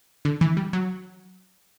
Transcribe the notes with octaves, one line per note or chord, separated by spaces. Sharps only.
D3
E3
G3
F#3